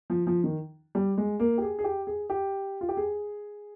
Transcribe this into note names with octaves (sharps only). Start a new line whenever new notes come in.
F3
F3
D#3
G3
G#3
A#3
G4
G#4
G#4
G4
G#4
G4
F4
G4
G#4